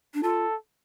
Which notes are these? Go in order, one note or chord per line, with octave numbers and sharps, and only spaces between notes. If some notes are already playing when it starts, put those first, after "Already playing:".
D4
F4 A4